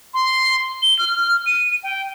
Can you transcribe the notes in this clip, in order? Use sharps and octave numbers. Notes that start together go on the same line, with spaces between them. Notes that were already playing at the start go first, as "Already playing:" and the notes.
C6
G7
F6
D#7
G5